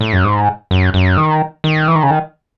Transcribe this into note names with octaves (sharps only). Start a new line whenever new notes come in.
A2
F#2
G#2
F#2
F#2
D#3
D#3
E3
D#3
C#3
D#3